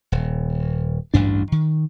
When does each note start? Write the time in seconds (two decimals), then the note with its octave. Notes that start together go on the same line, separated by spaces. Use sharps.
0.12 D#1
1.14 A1 D2 G2 D4
1.52 D#3